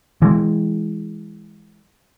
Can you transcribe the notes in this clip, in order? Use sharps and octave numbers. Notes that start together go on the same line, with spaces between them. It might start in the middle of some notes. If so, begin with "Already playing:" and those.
E3 G#3